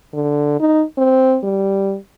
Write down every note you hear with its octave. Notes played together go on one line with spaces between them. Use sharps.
D3
D#4
C4
G3